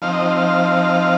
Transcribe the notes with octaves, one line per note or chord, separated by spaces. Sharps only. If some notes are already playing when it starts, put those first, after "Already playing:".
F3 C4 D#4 F5
D#5
F5
F5